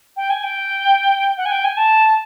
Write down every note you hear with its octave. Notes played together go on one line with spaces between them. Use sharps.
G5
G#5
G5
F#5
G#5
G5
G#5
A5